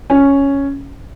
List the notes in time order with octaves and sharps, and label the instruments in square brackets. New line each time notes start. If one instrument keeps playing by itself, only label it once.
[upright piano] C#4